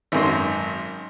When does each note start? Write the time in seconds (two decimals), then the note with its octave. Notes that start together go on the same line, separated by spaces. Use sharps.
0.12 G#1 F#2 C6